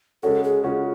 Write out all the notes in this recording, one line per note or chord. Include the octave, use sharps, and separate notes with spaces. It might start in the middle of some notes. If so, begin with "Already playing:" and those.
C#3 G#3 C#4 F#4 A4
G#4
C#3 G#3 C#4 F4 F#4